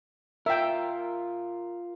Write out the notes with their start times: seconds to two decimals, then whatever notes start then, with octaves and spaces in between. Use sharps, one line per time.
0.46 F4 A#4 E5 G5